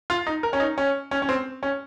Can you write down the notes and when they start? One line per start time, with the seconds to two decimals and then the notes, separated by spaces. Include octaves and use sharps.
0.10 F4
0.27 D#4
0.43 A#4
0.53 C#4
0.60 D#4
0.78 C#4
1.11 C#4
1.22 C#4
1.29 C4
1.63 C#4